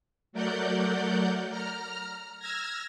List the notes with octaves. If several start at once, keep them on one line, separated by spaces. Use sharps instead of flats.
F#3 A3 A#4 D5 F#5 G6
A#5 F6
E6 F6 G#6 A#6